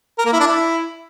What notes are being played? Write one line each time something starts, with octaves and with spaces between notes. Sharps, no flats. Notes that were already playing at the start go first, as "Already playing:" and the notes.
A#4
A#3
E4
D4
E4